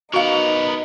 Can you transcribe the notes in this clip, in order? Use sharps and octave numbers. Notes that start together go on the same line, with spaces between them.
B3 D#4 F#4 A#4 F5